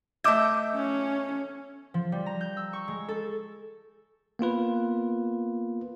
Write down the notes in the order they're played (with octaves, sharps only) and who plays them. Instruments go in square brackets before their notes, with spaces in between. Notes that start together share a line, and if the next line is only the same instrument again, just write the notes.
[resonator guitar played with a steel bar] A3 D#5 E5 [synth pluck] D6 G6
[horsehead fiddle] C#4
[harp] F3
G3
A#5
G6
E6
C#6
G#3
A4
[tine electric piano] A#3 B3 F4 B4